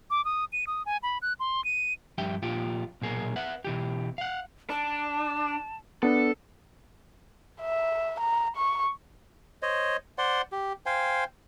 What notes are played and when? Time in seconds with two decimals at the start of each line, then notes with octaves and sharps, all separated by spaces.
0.10 D6
0.25 D#6
0.52 D#7
0.67 D#6
0.86 G#5
1.03 B5
1.22 F#6
1.40 C6
1.64 D#7
2.18 G2 F3 G4 E5 G5
2.43 A#2 F3 F4 G4
3.02 B1 A#2 G#4 A#4
3.36 B4 E5 F#5
3.65 B2 E3 G4
4.18 F5 F#5
4.70 D4 A5
6.03 B3 D4 A4
7.61 E5
8.20 A#5
8.56 C#6
9.62 C5 C#5 D#5
10.18 C5 D5 F#5 C6
10.52 G4
10.86 C5 F5 G5 G#5